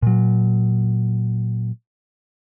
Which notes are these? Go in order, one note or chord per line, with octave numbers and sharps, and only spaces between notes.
A#2 F#3